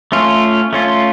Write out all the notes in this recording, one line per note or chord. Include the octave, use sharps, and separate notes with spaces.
A3 C#4 F4
A3 C#4 F4